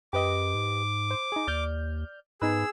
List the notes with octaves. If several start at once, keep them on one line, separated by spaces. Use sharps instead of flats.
F#2 G4 B4 D#5 D6
G#2
C5
D#4 G#4
D#2 D5 F6 G6
G#2 B3 D#4 G#4 B4 E6